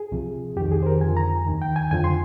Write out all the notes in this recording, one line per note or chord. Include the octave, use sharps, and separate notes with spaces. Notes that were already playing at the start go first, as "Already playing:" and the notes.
Already playing: G#4
C2 C3 F3
F2 D#3 G4
G#4
C5
A#4
F2 D3 F3 G#5
A#5
D#2 D#3
G5
G#5
F2 D3 F3 G#5
C6